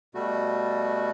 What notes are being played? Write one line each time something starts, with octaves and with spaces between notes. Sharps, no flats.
B2 G3 A3 F#4